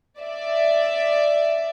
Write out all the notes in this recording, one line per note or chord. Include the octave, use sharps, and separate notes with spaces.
D5 E5